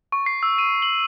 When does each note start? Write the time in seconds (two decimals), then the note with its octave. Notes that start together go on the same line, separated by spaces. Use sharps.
0.12 C#6
0.26 C7
0.43 E6
0.58 D#7
0.82 F#7